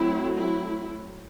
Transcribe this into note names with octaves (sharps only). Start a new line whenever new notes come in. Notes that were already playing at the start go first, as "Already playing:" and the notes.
Already playing: F#3 A3 C4 E4
E4